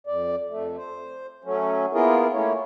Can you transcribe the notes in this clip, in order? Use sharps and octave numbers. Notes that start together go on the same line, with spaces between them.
F2 D5
F2 A3
C5
F#3 A3 C#4
A#3 B3 E4 F4 G#4 A#4
A3 A#3 C#4 E4 C#5